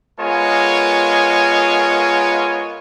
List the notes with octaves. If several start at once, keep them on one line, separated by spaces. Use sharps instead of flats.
G#3 B3 F4 A#4 C#5 G#5